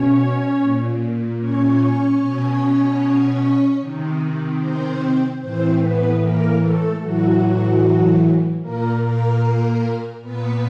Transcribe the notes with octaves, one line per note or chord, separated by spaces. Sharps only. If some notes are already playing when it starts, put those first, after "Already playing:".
Already playing: B2 C#4 C#5
A#2
C#4 C#5
B2
C3 D#3
C4 C5
A2 E3 C4 C5
B3 B4
A#3 A#4
A3 A4
A2 E3 F#3 F#4
A#2 A#3 A#4
A#3 A#4
A#2 B3 B4